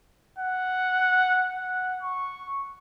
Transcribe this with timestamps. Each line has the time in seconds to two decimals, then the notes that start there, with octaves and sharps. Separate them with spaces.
0.39 F#5
1.55 F#5
2.03 C#6